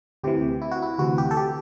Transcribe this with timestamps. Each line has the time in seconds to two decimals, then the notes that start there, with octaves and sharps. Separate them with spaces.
0.24 D2 C3 E3 G4
0.62 E4
0.71 F#4
0.82 E4
0.98 D2 C3 E3 F#4
1.18 G4
1.31 A4
1.37 G4